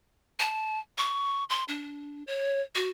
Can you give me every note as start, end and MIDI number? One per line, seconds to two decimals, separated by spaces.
0.40 0.79 81
0.98 1.44 85
1.50 1.64 84
1.68 2.24 62
2.27 2.62 73
2.75 2.90 66